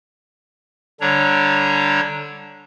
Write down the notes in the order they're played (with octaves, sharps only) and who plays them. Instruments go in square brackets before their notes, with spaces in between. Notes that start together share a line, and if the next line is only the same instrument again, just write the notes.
[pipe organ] D3 G3 D4 C#5 A#5